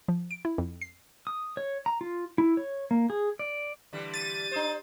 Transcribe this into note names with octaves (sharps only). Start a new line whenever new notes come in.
F3
D7
E4
F2
C7
D#6
C#5
A#5
F4
E4
C#5
A#3
G#4
D5
D3 E3 G3
A6 D#7
D4 C5